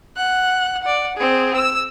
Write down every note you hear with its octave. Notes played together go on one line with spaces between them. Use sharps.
F#5 F#6
D5 F#5
C4 G#4
E6